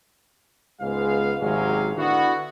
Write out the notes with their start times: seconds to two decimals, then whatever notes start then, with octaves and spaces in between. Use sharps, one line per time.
0.81 C#2 G#2 G#3 B3 F5
1.41 G#1 C3 F#3 G#3 C#4 F5
1.97 D3 B3 E4 F#4